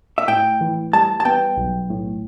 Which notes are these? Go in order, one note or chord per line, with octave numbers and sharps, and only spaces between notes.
E5
A2 G5
E3
G3 A5
A5
B3 G5
B1
A2